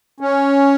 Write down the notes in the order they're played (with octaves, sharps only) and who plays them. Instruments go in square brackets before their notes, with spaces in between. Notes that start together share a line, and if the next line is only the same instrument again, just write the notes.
[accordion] C#4